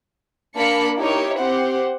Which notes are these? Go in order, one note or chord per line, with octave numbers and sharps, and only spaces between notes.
A#3 D4 A#4 A5 B5 C#7
D#4 E4 G4 A#4 C#5
C4 G4 C5 F#5